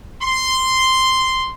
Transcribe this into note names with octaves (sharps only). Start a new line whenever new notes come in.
C6